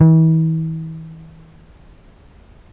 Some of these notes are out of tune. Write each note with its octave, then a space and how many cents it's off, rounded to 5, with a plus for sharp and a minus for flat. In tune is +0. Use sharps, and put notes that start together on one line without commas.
E3 -40